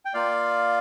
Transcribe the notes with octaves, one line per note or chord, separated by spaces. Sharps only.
G5
A#3 F4 D5 F5